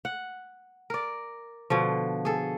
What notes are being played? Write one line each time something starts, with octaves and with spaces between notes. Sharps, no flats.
F#5
A#4 D5
B2 D3 F3
G#4 A4